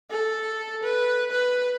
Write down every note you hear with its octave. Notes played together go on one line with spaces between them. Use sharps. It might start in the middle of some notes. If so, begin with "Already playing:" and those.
A4
B4
B4